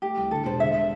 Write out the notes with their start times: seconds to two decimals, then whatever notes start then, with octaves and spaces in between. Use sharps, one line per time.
0.02 A3 G4
0.17 C2
0.31 D3 A4
0.45 E1 C5
0.60 D3 E5
0.74 E5